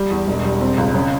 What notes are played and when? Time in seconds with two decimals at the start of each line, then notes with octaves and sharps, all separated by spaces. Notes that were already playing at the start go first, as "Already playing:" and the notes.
Already playing: G3
0.10 E2
0.28 E1
0.45 G3
0.61 C4
0.78 C#2
0.94 C#3